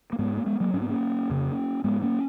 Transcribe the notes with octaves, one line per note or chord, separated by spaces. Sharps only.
A#3
G#2 G#3 B3
A#3
G#3 B3
F#3 A#3
G#2 C#4
B3
A#3 C#4
F2 C#3
G#2 G#3 B3
A#3 C#4